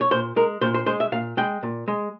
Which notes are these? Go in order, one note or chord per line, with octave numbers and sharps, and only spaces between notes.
C#5
A#2 C5
G#3 A#4
A#2 C5
C5
G#3 C5
E5
A#2 F5
G#3 G5
A#2
G#3